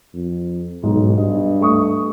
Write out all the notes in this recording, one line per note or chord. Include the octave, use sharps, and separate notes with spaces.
F2
B1 G#2
G2 D#5
A3 C#6 D#6